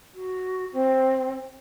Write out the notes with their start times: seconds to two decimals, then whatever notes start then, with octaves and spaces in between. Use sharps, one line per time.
0.15 F#4
0.73 C4